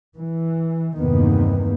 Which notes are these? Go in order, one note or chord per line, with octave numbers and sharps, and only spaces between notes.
E3
E2 G2 C3 D#3 A#3 B3